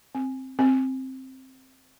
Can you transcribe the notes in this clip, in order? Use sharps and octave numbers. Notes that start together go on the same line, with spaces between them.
C4
C4